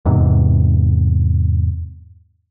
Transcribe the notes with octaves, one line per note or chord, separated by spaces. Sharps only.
E2 G#2 C3